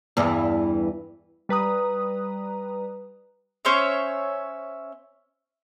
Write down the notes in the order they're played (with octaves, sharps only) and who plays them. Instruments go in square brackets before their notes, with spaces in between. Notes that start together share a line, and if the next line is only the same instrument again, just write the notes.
[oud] E2 G2 E3
[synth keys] G3 B4 A#5 D#6
[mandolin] C#4 C5 C#5 E5